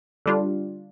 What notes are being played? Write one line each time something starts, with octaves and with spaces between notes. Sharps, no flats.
D3 G3 D4 F4